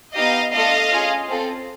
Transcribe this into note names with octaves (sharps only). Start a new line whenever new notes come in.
B3 D#4 G4 D#5 F5
A3 D4 F4 A4 D#5 F5
C#4 F4 G#4
C4 F4 A4